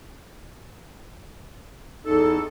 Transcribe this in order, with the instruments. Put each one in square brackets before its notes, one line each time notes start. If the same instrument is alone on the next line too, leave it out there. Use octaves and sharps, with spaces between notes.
[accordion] E2 A4 [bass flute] D#4